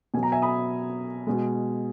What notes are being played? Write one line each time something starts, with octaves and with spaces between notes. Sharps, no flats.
B2 F#3 G#5
A#5
E5 G#5
B5 D#6
B2 G#3